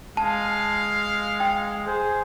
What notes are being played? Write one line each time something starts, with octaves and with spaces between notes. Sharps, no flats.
G#3 F5 A5
G5
G#4 C5